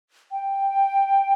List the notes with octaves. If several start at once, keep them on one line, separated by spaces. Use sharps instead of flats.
G5